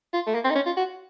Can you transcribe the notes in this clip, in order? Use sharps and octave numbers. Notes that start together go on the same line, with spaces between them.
F4
A3
A#3
C4
D#4
C#4
F4
F#4